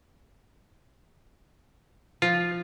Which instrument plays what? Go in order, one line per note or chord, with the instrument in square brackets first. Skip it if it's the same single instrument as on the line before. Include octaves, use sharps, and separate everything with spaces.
[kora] F3 [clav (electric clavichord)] F4